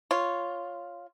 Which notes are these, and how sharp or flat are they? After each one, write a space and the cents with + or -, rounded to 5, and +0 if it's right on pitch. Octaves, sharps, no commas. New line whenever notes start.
F4 +0 C#5 +0